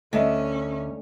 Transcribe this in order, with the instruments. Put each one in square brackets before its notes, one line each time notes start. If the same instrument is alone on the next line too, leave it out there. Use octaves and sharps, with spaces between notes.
[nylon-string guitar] D2 [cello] C#4 [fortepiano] D#5 E5